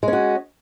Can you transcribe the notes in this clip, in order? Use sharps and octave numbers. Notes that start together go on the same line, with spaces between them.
G#3 C#4 F#4